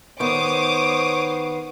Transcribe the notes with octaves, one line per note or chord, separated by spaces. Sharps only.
D#3 B3 C5 C#5 D6 D#6